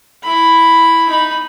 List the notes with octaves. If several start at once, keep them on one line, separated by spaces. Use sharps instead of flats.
E4 B5
D#4 B5